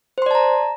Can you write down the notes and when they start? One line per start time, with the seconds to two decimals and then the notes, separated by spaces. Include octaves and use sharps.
0.18 C5
0.22 C6
0.26 D5
0.31 A5
0.35 A#5